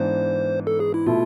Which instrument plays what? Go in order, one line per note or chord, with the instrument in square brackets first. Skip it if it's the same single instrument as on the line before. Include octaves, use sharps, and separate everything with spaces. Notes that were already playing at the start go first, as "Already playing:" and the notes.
Already playing: [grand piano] G#2 E3 B3 D4 [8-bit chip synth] C5
[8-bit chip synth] A4
G#4
E4
[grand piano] B2 A3 E4 [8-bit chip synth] F4